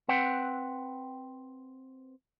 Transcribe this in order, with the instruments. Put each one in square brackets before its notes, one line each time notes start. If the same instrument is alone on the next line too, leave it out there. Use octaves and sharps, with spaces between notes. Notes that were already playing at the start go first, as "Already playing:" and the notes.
[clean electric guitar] C4 B4 F#5 G5